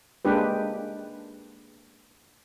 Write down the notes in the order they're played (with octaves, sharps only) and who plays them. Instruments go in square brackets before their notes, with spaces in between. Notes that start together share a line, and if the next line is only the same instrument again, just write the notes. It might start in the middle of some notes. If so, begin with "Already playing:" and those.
[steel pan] G#3 A#3 D4 G4 B4